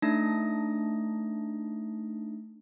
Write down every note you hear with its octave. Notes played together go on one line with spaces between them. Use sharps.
A3 D4 D#4 D#6 A#6